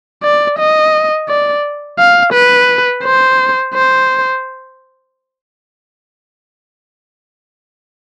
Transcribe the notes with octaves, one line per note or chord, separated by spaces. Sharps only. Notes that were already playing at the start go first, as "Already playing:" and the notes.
D5
D#5
D5
F5
B4
C5
C5